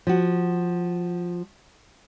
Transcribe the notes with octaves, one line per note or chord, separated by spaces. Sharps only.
F3 F#4